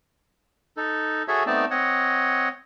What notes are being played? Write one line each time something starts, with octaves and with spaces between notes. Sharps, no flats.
D#4 A4
F#4 G#4 A4 C#5 E5
A3 B3 C4 D#4 D5 A5
C4 C#5 D#5 F#5